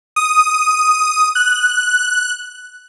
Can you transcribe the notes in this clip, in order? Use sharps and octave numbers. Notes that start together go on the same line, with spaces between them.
D#6
F#6